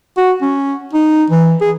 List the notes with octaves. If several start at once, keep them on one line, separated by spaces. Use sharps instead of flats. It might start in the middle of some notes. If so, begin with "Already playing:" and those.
F#4
C#4
D#4
E3
G#4